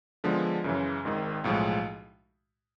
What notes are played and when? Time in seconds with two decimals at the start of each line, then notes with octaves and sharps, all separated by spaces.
0.24 D3 F3 G#3 B3
0.64 F#2 C#3 E3
1.05 G#1 G#2 D#3
1.44 B1 A2 F3 G#3